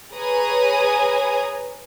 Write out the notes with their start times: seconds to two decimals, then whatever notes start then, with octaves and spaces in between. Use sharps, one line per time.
0.13 G#4 B4 C#5 G#5 A#5 D#6